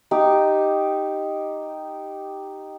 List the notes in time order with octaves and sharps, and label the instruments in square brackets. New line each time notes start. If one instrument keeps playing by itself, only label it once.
[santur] D#4 G4